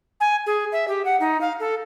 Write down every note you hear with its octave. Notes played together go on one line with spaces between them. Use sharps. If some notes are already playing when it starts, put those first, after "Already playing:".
G#5
G#4
E5
G4
F#5
D#4
F5
A4